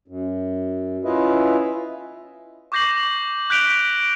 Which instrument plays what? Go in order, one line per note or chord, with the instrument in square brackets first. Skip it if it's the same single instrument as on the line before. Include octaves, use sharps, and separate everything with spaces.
[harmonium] F#2
C#4 E4 F4 B4 D#5 E5
[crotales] C#6 D6 G6 A#6 C7 F#7
F#6 G6 B6 D7 F7 G7